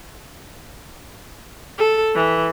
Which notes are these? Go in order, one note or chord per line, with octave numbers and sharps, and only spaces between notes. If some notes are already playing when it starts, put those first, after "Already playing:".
A4
E3